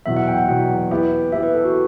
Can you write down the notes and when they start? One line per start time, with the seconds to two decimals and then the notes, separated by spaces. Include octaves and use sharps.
0.06 E2 B2 F#3 E5
0.17 F#5
0.28 G5
0.38 F#5
0.48 E2 B2 F#3
0.91 E3 B3 E4 G4
1.32 E3 B3 E4 G4 E5
1.43 B4
1.54 A4
1.65 F#4